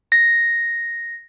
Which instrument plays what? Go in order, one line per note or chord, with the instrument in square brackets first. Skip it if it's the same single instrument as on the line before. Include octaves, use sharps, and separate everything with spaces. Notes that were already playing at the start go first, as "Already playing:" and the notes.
[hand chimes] A#6